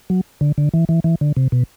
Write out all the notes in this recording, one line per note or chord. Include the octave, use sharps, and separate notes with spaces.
F#3
D3
D3
E3
E3
E3
D3
C3
B2